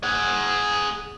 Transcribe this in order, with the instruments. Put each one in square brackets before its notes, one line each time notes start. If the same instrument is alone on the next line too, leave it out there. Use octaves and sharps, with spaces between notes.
[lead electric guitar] G#4 F#5